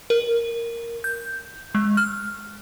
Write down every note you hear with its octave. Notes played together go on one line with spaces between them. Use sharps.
A#4
G6
G#3
F6